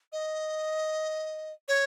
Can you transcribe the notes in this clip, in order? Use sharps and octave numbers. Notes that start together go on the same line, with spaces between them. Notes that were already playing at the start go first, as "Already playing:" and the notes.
D#5
C#5